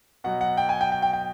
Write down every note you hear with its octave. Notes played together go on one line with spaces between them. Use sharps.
B2 F#3 F#5
F#5
G5
G#5
G5
G5
G5
G5